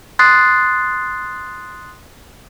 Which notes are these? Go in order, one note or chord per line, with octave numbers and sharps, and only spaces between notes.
C6 D#6 F#6 A6 C7